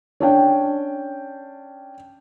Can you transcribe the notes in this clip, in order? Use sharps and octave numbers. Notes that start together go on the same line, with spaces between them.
C#4 D4 G5